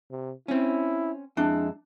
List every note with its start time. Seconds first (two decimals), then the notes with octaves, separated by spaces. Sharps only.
0.11 C3
0.48 C4 C#4 E4
1.37 F2 G#3 D4 E4